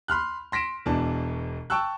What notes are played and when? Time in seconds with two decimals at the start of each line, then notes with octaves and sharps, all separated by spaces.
0.08 B5 C6 F6 F#6
0.52 C6 A#6 B6 D7 E7
0.86 E1 B2 E3 D4 A5
1.70 G5 A5 C#6 E6 F#6